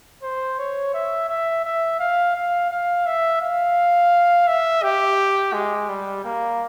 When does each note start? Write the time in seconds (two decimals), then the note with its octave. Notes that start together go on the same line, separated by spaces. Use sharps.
0.23 C5
0.59 C#5
0.94 E5
1.29 E5
1.65 E5
2.00 F5
2.36 F5
2.70 F5
3.06 E5
3.42 F5
4.47 E5
4.83 G4
5.53 G#3
5.89 G3
6.25 A#3